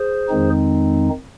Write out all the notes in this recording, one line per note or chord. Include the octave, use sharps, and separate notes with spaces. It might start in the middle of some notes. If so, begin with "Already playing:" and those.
Already playing: G#4 C5
F2 D#3 G#3 C4 D#4